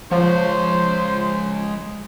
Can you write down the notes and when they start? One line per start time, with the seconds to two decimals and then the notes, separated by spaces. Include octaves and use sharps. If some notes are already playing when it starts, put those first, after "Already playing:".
0.11 F3 G#3 C5 C#5